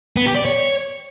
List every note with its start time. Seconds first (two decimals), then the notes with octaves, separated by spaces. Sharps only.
0.16 B3
0.26 G4
0.36 D5
0.45 C#5